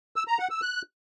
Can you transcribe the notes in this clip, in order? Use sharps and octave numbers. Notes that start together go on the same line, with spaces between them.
E6
A#5
F#5
E6
F#6